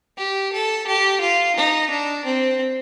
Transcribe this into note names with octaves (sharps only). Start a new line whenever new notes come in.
G4
A4
G4
F4
D#4
D4
C4